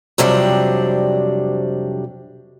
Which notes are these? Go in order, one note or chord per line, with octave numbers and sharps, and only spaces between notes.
F2 C3 F#3 G3 D4